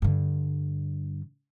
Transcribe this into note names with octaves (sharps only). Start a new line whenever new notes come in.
G2 D3